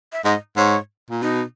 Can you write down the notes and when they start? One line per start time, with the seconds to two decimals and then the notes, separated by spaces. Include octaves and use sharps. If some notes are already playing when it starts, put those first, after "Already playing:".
0.13 E5
0.24 G#2 D#5
0.57 G#2 C#5
1.10 A#2
1.22 B2 D#4